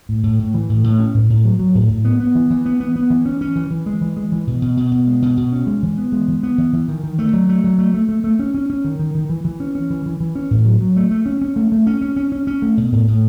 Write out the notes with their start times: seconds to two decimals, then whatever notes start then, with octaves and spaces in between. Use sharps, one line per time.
0.09 A2
0.23 A2
0.39 A2
0.54 E3
0.69 A2
0.84 A2
0.99 C#4
1.14 A2
1.30 A2
1.45 F#3
1.59 F#3
1.75 A2
1.90 A2
2.05 B3
2.20 B3
2.35 E3
2.51 E3
2.66 B3
2.80 B3
2.96 B3
3.10 E3
3.25 C#4
3.41 C#4
3.56 E3
3.71 E3
3.86 G#3
4.01 E3
4.17 G#3
4.32 E3
4.47 B2
4.62 B2
4.77 B2
4.92 B2
5.07 G#3
5.22 B2
5.37 B2
5.52 C#4
5.67 G#3
5.83 E3
5.98 B3
6.12 G#3
6.28 E3
6.43 B3
6.58 E3
6.73 E3
6.88 D#3
7.04 D#3
7.19 A3
7.33 F#3
7.49 A3
7.64 F#3
7.78 A3
7.94 A3
8.09 A3
8.24 A3
8.39 C#4
8.55 C#4
8.70 C#4
8.84 D#3
8.99 D#3
9.15 D#3
9.30 E3
9.45 E3
9.60 C#4
9.75 C#4
9.90 E3
10.06 E3
10.20 E3
10.35 C#4
10.51 A2
10.66 F#3
10.81 F#3
10.96 A3
11.11 A3
11.26 C#4
11.42 C#4
11.56 A3
11.72 A3
11.87 C#4
12.01 C#4
12.17 C#4
12.32 C#4
12.47 C#4
12.62 A3
12.77 B2
12.92 A2
13.08 A2